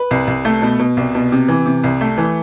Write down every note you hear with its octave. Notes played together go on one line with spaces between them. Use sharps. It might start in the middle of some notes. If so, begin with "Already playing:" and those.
Already playing: B4
C2
C2
A3
B2
B2
C2
B2
C3
E3
C3
C2
A3
E3